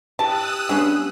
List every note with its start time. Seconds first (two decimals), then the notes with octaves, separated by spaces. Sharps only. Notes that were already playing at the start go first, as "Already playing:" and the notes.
0.19 E3 G4 A5 D#6 E6 F#6
0.69 G2 G3 B3 C#4 G#4